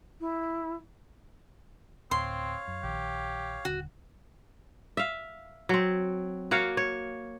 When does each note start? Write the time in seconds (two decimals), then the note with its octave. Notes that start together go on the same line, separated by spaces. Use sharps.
0.20 E4
2.11 D2 A2 C4 C#5 F5 C6
2.68 F#2
2.83 A#1 D#3 G4
3.65 D#1 D3 F#4
4.97 E5 F5
5.69 F#3 C4
6.51 A#3 F#4 C#5 F5
6.77 C#5